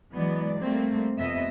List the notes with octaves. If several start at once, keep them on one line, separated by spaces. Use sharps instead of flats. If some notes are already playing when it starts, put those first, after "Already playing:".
E3 F#3 G#3 B3 D5
G3 A3 A#3 C4
F2 C3 A3 B3 D#5 E5